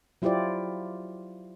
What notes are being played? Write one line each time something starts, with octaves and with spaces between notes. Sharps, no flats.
F#3 E4 F4 G4 C5 D5